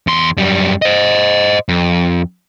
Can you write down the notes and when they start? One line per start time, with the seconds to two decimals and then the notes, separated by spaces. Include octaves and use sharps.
0.07 E2 C6
0.37 F#2 G3
0.82 C5 D#5
1.69 F2